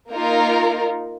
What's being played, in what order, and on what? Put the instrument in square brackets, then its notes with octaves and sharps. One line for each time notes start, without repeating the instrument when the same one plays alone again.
[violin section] A#3 D#4 F4 A#4